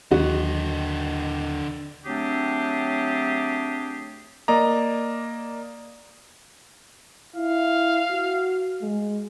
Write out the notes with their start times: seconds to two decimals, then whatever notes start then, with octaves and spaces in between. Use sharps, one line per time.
0.11 D#2 D3 F#4 D#5
2.06 F#3 A3 C4 D4 G4 G#4
4.48 A#3 D5 D#5 A#5
7.36 E4 F5
8.11 F#4
8.82 G#3